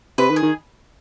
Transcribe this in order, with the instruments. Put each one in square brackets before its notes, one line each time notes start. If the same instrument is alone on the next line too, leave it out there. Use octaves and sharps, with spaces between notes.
[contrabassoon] C3 [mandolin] B4
[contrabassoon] D#3
[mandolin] G#4
[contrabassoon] D#3